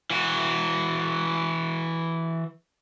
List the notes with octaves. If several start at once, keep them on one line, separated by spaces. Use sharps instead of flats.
E3 F#4